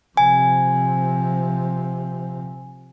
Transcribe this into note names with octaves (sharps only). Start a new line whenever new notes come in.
C3 F3 G#5